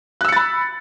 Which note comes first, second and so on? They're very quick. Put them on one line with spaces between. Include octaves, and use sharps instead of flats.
F#6 E6 C#7 A6 B5